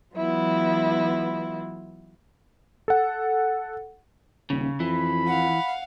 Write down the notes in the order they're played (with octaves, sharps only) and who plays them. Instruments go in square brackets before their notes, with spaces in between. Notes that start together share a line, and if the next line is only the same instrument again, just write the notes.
[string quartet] E3 F#3 G#3 B3 E4 F4
[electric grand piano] A4 F#5
[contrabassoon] D#1 [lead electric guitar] C#3
[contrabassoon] F2 [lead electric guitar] E3 [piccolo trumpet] B5
[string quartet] F5 F#5